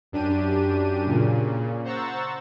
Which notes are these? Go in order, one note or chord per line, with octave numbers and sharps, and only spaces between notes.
F#2 D4 G4 D#7
A#2 C#3
C5 F#5 A#5 C#6 E6 A6